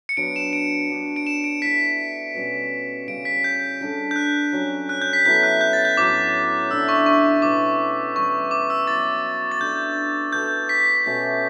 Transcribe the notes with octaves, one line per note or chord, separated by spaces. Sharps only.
C#7
F#3 B3 D4 D7
E7
D7
B3 D4 G4 C#5
D7
E7
D7
A3 E4 B4 B6
B2 G3 C#4 G4
C#3 G3 C#4 D7
B6
G6
G3 D4 A4
G6
F#6
F#3 C#4 G4 C#5
F#6
G6
B6
F#3 B3 E4 A4 G6
F#6
G6
A6
G6
A2 F#3 B3 D6
D3 A3 E4 B4 E6
C#6
C#6
B2 G3 C#4 E4 D6
E3 G3 B3 C#6
D6
E6
F#3 B3 E4 A6
A6
A3 D4 G4 D5 G6
B3 F#4 A4 G6
B6
B2 A3 C#4 G4